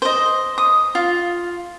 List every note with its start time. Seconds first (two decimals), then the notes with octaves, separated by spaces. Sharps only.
0.02 C5 D#5
0.58 D#6
0.95 F4